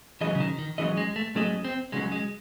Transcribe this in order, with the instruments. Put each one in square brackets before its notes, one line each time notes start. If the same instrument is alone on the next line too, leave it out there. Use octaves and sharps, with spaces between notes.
[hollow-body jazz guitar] G#2 F#3 C#4 G#4 D#5 [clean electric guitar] E3
[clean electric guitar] C#3
D#3
D#3
[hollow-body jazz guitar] G#2 F#3 C#4 G#4 D#5 [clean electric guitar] E3
[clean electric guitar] G#3
A3
[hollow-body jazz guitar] G#2 F#3 C#4 G#4 D#5 [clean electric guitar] A3
[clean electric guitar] C4
[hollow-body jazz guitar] C#2 C#3 F#3 C#4 [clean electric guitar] G#3
[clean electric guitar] G#3